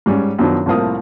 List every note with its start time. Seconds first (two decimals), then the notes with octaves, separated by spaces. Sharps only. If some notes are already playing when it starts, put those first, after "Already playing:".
0.06 G#2 G3 C#4
0.39 F#2 B2 D#3 F3 D4
0.66 C2 A2 F3 A#3 F5 D#6